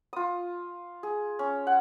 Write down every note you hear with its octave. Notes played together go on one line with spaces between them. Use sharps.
F4 D#6
G#4
C#4
F#5